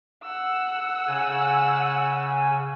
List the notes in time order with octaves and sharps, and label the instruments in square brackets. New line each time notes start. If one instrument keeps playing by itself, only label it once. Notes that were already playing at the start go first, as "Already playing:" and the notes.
[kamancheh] F#5 E6
[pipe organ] C#3 G#5